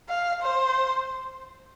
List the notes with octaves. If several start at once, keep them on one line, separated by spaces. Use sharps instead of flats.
F5
C5